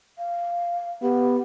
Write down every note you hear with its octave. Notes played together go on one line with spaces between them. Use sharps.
F5
B3 G4